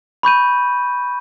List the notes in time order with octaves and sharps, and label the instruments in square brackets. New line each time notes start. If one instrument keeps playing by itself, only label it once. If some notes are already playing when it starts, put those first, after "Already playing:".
[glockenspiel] B5 C#6 G6 D#7